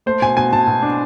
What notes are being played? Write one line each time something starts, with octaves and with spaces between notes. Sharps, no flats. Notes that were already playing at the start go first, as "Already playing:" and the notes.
A3 C5
B2 G#5
B2 G#5
B2 A5
B2
D4